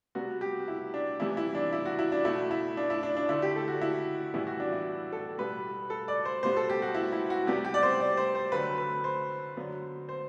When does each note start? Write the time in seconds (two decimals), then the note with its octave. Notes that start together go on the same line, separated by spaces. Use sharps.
0.15 C3 G3 B3 F#4
0.41 G4
0.68 E4
0.94 D4
1.20 C3 E3 G3 B3 E4
1.37 E4
1.55 D4
1.73 E4
1.86 F#4
1.99 E4
2.12 D4
2.25 B2 A3 E4
2.51 E4
2.77 D4
2.90 E4
3.03 D4
3.17 D4
3.29 D3 A3 E4
3.42 G4
3.56 A4
3.68 F#4
3.81 E4
4.34 A2 E3 G3 B3 E4
4.47 F#4
4.60 D4
4.72 E4
5.12 A4
5.38 B2 G3 B3 B4
5.90 A4
6.08 D5
6.25 C5
6.43 B2 G3 B3 C5
6.57 A4
6.69 G4
6.82 F#4
6.95 E4
7.12 E4
7.30 F#4
7.47 C3 G3 B3 G4
7.65 G4
7.74 D5
7.83 C5
8.00 D5
8.17 C5
8.35 C5
8.52 D3 F#3 A3 B4
8.78 B4
9.04 C5
9.57 D3 F#3 B3
10.09 C5